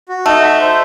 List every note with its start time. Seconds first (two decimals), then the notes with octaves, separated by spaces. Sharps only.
0.09 F#4
0.26 A3 D#4
0.43 E5
0.60 C5